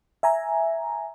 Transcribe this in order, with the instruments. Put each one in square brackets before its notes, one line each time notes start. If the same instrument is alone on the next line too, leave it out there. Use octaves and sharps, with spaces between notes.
[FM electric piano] E5 G#5 A#5